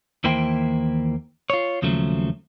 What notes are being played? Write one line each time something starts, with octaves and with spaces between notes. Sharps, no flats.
D#2 E3 A#3 E4 C5 G5
F4 C#5
D#2 C#3 F3 F#3 A3